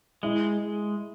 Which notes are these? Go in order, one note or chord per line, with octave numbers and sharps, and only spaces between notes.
G#3 E4